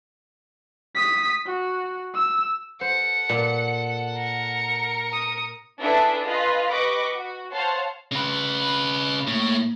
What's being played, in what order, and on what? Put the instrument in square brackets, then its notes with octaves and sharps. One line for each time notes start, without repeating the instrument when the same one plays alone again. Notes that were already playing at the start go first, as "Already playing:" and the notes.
[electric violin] D#6 B6
F#4
E6
[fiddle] A4 F#5 [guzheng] C5 [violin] C#7
[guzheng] A#2
[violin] A#4 C#7
[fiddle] D#6
[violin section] D4 E4 G#4 A4 B4 E5
F4 B4 D#5 G#5
G4 B4 D#5 B5 C#6 D6
F#4
C5 C#5 F5 F#5 A5 C6
[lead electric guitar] C#3 B4
[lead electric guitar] A2 [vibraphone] A#3